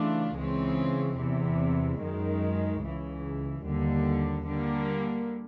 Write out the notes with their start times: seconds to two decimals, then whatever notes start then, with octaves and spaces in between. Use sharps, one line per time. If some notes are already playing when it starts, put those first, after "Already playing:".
Already playing: C#3 E3 A3 D4 F4
0.35 C#2 C#3 E3 G#3 C4
1.18 E2 C3 E3
2.01 F#2 D#3 G#3
2.83 C#2 C#3 E3
3.64 D#2 D3 G3
4.48 D3 G3 A#3